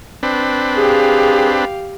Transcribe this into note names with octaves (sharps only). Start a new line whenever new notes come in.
C4 D4 B4
G4 G#4 F5